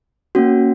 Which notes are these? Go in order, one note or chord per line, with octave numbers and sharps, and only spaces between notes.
A#3 C#4 F#4